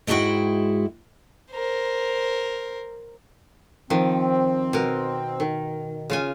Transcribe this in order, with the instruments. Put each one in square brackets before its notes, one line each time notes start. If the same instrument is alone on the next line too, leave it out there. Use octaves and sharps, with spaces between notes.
[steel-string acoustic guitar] G#2 G#3 D4 E4 F#4 G5
[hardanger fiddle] A#4 C5
[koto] D#3 F3 [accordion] C4
[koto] B2 A#4
D#3
C#3 F4 G#5